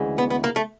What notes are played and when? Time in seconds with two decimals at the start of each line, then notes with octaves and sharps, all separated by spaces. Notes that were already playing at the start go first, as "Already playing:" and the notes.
Already playing: D2 C#3 E3 G#3
0.18 B3
0.30 B3
0.44 A#3
0.56 A3